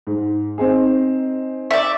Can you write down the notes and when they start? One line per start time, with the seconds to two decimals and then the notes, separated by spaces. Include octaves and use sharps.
0.07 G#2
0.58 C4 D#4 G#4
1.71 D5 E5